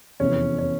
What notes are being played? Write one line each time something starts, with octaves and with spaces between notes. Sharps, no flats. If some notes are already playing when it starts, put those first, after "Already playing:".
F1 E2 E3 C#4
C#4